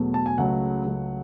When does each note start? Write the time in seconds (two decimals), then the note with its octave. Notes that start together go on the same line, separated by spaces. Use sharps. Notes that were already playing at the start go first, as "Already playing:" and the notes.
Already playing: E2 B2 F#3 A3
0.14 A5
0.26 G#5
0.38 C#2 C#3 F#3 A3 F#5
0.85 C#2 C#3 F#3 A3